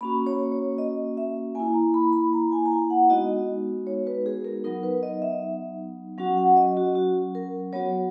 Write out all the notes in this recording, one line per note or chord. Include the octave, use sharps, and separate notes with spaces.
A#3 C#4 F#4 B5
C#5
C#5
D#5
E5
A#3 E4 G#5
A#5
B5
B5
A#5
G#5
A#5
G#5
F#5
G#3 B3 D#4 F#4 D#5
C#5
B4
G#4
A#4
F#3 B3 D#4 A#4
B4
D#5
E5
F#3 C#4 F#4 F#5
F#5
D#5
F#4
F#4
A#4
F#3 B3 F#4 C#5